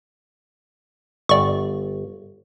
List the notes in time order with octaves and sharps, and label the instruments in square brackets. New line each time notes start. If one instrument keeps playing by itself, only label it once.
[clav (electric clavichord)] G1 [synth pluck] D5 C#6